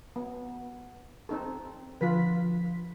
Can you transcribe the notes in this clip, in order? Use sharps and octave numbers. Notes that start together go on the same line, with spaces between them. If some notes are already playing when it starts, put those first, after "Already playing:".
B3
C4 D#4 A4
D3 F3 F4 B4 B6